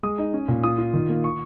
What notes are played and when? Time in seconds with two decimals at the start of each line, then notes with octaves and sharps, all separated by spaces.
0.03 G#3 D#6
0.18 D#4
0.33 C#4
0.48 A#2
0.64 F4 D#6
0.78 F4
0.94 D#3
1.09 A#3
1.24 C#6